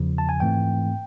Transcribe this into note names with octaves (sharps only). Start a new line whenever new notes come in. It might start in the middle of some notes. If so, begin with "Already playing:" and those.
Already playing: E2 C#3 F3
A5
G#5
G#2 E3 A3 C4 G5